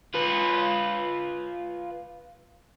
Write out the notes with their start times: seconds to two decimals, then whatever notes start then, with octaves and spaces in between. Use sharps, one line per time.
0.14 F4 B4